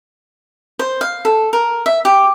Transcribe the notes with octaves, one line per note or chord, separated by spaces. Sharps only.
C5
F5
A4
A#4
E5
G4